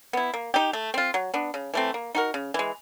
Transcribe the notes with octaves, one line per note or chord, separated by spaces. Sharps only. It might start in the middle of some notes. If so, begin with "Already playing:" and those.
B3 E4
A#3
D#4 G4
A3
C4 F4
F#3
B3 D4
C#3
E3 A3 C4
A#3
D#4 F#4 A#4
C#3
E3 G#3